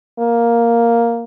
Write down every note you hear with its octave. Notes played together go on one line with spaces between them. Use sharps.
A#3